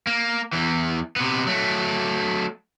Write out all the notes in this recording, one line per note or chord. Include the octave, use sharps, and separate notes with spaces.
A#3
E2 E3
C3 B3
F#3 A3